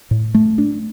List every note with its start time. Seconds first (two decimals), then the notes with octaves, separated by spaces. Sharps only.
0.11 A2
0.34 A3
0.58 D4